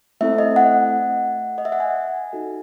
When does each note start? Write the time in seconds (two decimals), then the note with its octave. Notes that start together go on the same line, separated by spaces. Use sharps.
0.21 A3 C4 E4 A4 E5
0.38 D#5
0.56 F#5
1.58 D#5
1.65 E5
1.72 F#5
1.80 G#5
2.33 D#4 F#4 A4